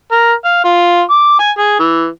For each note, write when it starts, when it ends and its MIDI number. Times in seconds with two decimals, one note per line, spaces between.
0.12 0.32 70
0.45 0.62 77
0.64 1.01 65
1.10 1.35 86
1.39 1.51 80
1.58 1.79 68
1.80 2.08 52